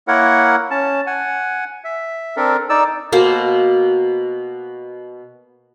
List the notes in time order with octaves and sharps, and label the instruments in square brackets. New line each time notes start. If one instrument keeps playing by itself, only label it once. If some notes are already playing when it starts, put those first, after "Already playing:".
[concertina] A#3 E4 A#4 C#5 F#5
C#4 A5
F#5 G#5
E5
C4 D4 A4 A#4
D#4 D5 E6
[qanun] B2 A#3 C5